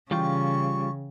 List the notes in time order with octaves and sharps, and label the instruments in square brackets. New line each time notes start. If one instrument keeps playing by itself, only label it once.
[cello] C#3 [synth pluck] E3 G5 [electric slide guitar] G3 F4 [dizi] C#6